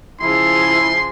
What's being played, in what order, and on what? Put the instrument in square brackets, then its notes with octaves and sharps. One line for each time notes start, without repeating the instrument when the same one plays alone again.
[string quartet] C#3 F3 G#4 [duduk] E4 [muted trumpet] C6